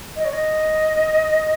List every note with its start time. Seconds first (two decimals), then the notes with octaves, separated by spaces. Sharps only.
0.16 D#5
0.25 C#5
0.33 D#5